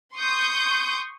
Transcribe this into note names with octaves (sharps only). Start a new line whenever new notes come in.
C6 C#6 D#6 G6